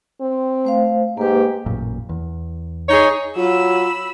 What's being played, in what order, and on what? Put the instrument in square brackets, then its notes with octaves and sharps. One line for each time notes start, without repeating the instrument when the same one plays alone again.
[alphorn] C4
[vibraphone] A3 C5 F5
[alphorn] G#2 [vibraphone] A#3 B4 [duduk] G4
[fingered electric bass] A1 F#2 A#2
E2
[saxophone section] D#4 G#4 C#5
[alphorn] F#3 [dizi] F4 [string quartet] B5 E6